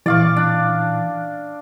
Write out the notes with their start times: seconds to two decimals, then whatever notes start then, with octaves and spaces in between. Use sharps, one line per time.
0.06 A#2 E3 D5 F5 C#6
0.36 D4